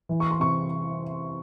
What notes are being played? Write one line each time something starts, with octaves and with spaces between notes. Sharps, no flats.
E3
C#6
C6
C3 C#6